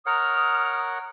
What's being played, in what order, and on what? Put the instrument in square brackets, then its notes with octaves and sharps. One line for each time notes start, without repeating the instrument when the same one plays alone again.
[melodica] A#4 C#5 F#5 [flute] D#6 [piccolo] F6